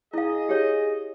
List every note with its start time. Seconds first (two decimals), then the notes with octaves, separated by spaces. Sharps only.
0.14 E4 G#4 D#5 F5
0.49 G4 C#5